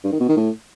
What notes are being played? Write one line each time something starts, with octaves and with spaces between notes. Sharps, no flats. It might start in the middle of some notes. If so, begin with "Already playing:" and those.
G2
D#3
B2
D#3
A2